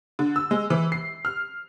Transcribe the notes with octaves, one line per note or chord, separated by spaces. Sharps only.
D3
E6
G#3
E3
C7
F6